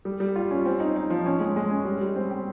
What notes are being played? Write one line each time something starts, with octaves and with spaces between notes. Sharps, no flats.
G3
G3
F4
C#4
C4
D#4
D#4
F3
C#4
G#3
G#3
C#4
G3
G3
C4
G4